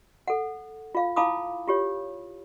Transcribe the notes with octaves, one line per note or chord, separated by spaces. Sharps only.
A4 F#5
F4 F5
E4 F5 A5 B5 D6 D#6
F4 G4 C#5